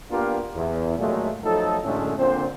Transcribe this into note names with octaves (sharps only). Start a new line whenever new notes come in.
A#3 B3 D4 F4 G4 A#4
E2
D#2 A#2 F#3 G#3 A3
F3 F#3 A3 D#4 A4
F#2 A2 D3 G#3 A3 C#4
A#2 D3 C4 C5